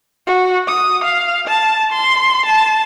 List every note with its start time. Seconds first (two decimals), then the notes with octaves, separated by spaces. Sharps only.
0.27 F#4
0.68 D#6
1.04 F5
1.47 A5
1.92 C6
2.46 A5